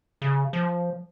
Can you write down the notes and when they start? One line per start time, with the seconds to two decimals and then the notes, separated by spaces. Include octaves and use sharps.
0.22 C#3
0.53 F3